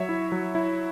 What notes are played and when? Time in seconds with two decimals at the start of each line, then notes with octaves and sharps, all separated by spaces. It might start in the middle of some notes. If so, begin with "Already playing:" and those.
Already playing: F#3 C#5 E5
0.09 E4
0.32 F#3
0.55 E4